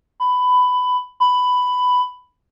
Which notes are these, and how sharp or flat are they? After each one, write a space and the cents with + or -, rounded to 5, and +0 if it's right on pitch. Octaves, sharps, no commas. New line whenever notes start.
B5 +15
B5 +10